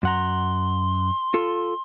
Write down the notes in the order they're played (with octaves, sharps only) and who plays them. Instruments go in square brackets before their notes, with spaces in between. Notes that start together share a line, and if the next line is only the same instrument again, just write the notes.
[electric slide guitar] F#2 F#5 A#5 [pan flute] C6
[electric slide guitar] F4 A4